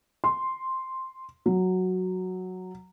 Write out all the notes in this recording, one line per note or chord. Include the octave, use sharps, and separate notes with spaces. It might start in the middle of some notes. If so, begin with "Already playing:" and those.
C6
F#3